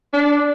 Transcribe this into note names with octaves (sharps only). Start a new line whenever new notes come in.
D4